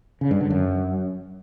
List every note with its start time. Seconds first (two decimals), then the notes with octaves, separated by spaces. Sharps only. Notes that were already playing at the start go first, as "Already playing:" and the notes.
0.21 C#3
0.31 G2
0.41 D3
0.50 F#2